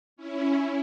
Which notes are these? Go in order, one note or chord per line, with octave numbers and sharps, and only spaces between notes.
C#4 E4